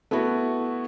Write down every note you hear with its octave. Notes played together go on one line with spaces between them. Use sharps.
A3 B3 E4 F#4